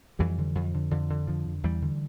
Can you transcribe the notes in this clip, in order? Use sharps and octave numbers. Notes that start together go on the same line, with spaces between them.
F2 E3 G3
D3
F2
D3
F2 D3 F3
D3
F2 D3 F3
D3
E2 E3 G3
D3